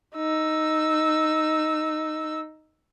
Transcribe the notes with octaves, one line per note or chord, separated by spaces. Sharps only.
D#4 E6